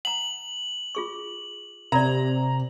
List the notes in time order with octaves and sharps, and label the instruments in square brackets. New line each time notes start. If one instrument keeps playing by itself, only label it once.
[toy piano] F#5 A#5 [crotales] F#7
[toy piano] F4 G#4 C#6
[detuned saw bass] C3 [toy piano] A#4 D5 [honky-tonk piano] A#5